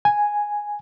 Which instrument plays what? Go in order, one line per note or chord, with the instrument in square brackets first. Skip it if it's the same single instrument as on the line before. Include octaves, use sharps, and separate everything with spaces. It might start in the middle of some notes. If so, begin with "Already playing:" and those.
[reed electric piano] G#5